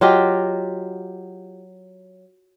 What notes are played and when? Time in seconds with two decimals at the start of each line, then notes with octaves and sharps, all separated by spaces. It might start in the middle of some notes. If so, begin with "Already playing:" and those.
0.01 F#3 F4 G4 D#5